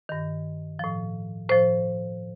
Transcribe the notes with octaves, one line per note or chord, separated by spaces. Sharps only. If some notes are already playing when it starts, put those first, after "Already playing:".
G2 D#3
A2 F3
A2 F3 C5